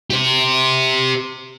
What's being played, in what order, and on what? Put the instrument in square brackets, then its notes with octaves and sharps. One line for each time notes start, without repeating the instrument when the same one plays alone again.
[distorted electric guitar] G4 C5